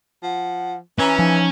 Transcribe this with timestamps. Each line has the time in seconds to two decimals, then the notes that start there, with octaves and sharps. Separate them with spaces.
0.23 F3 F#5
0.99 E3 C#4 A#5
1.19 F3 D#4